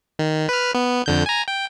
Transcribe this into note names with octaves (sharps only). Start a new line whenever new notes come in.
D#3
B4 F6
B3
F2 D3 G6
G#5 A#5
G5